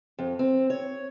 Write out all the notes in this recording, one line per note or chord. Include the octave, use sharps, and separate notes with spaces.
F2
C4
C#5